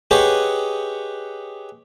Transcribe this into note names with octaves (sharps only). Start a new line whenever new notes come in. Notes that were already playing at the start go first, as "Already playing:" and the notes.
G4 G#4 B4 C#5 D#5 F#5